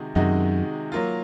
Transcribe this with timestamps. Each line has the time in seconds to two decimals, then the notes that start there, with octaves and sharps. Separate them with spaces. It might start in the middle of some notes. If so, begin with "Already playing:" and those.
Already playing: C3 D#3 G#3 D#4 F#4
0.15 F#2 C3 D#3 G#3 D#4 F#4
0.92 F#3 A#3 F4